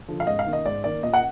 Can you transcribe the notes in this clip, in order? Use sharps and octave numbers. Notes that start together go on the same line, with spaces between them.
D3 F3
F5
G#2 D#5
F5
D#3 A#3
D#5
G#2 D5
D#3 A#3 D5
A#2 D#5
F#5